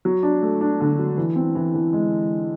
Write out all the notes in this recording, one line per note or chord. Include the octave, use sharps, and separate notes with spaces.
F#3
D4
A3
D4
D3
F#3
E3
C4
E3
E3
G#3